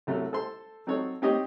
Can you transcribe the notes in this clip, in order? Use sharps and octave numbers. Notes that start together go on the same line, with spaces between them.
C2 F#3 A3
A4 C5 C6
F#3 C4 D#4 A4 C#5
C4 D#4 G4 C#5 D#5